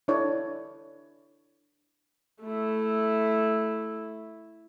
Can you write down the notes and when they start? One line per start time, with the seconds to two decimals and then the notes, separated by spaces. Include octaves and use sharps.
0.08 D4 E4 A4 C#5 D5
2.43 A3 E4